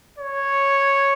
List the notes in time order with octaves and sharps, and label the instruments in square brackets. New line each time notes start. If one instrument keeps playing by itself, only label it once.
[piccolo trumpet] C#5